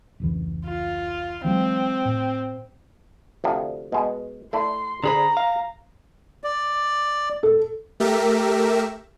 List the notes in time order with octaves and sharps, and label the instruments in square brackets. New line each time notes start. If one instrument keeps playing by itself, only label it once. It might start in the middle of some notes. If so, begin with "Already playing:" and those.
[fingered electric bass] F1 C#2 E3
[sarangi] F4
[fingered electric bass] E3 F#3 G#3 [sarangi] C4
[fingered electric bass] A2
[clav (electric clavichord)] D2 C3 F3
B2 G#3
[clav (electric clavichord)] A3 E4 D5 [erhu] C6
[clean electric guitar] D3 G#4 B5 [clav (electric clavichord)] C5 D5 [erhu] A#5
[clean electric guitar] F5
[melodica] D5
[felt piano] A4
[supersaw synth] A3 G4 A#4 E5